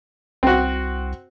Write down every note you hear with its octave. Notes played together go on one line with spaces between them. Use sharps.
C2 C4 F#4